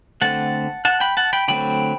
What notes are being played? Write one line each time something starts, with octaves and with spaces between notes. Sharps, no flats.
D3 A3 C4 F#5 A5
F#5 A5
G5 B5
F#5 A5
G5 B5
D3 F#3 A3 C4 G5 B5